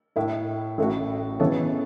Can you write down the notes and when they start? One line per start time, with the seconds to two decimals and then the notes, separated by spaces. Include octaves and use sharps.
0.16 A2 A3 E4
0.78 A1 A2 A3 F#4
1.39 C#3 E3 B3 A4 C#5